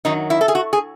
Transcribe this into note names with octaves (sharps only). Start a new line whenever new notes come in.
F#2 D#3 F#3 D#4
E4
A4
G#4
F#4
G#4